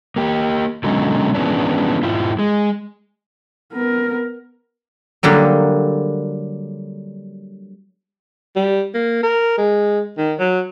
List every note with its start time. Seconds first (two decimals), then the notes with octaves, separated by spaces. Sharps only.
0.16 A#3 G4
0.84 B2 D3 F#3 G#3 C#4 D#4
1.34 E3 F3 G#3 B3 C#4 D4
2.03 G#2 E4 F4
2.39 G#3
3.73 B3 A#4
5.23 D3 F#3 G3 A#3
8.56 G3
8.94 A#3
9.23 A#4
9.57 G#3
10.18 D#3
10.39 F#3